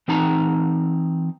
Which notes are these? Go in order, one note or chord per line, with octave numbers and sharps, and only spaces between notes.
E3 C4 D#4 A5 A#5